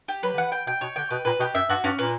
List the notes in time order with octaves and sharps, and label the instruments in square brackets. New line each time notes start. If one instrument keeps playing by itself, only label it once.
[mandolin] G4
[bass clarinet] F#3 [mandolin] B4
[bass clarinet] D3
[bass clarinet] E3 [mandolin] F#5
[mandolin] G5
[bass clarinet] B2 [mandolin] G5
[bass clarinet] B2 [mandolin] C#5
[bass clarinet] D3 [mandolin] G5
[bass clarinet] B2 [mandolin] B4
[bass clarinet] A#2 [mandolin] B4
[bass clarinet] B2 [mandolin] G4
[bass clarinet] F#2 [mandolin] E5
[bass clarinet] G2 [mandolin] F#4
[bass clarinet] G2 [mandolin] C#4
[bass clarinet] A#2 [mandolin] B4